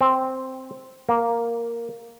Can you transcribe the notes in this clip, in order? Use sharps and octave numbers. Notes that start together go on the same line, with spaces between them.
C4
A#3